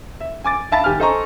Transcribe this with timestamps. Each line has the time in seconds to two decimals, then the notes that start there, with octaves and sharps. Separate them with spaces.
0.20 E5
0.44 G#5 D6 A6
0.72 E5 F5 A5 B5 A6
0.84 G#1 G4 G#5 F6
1.00 A4 C5 D#5 G#5 A#5 C#6